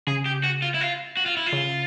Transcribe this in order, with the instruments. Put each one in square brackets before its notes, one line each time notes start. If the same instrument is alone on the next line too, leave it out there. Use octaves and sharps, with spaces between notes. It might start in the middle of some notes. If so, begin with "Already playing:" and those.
[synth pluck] C#3 [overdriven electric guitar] G#4
[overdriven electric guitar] G4
F#4
F4
E4
F4
F#4
F4
E4
F4
[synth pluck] C#3